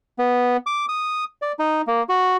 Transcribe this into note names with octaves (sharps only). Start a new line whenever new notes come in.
B3
D6
D#6
D5
D#4
A#3
F#4